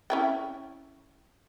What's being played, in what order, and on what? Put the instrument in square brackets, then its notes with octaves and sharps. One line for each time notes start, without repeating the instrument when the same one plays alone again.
[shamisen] C#4 E4 G5